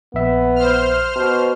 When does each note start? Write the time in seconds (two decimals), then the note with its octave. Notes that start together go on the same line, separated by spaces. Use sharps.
0.14 A#1 B3 E5
0.55 C5 F6
1.16 B2